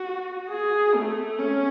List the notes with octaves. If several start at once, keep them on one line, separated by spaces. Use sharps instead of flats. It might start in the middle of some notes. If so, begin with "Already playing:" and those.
Already playing: F#4
G#4
A3
C#4